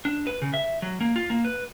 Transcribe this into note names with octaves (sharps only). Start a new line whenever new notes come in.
D4
B4
C#3
E5
F#3
A#3
F4
A#3
B4